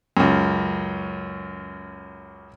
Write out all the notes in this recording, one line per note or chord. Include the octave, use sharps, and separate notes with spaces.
C#2 F#2